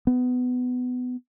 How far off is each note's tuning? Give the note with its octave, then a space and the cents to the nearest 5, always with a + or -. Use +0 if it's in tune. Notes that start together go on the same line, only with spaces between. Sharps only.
B3 +20